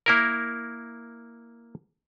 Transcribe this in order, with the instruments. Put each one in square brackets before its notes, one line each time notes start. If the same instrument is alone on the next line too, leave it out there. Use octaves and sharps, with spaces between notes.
[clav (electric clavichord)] A#3 E4 A#4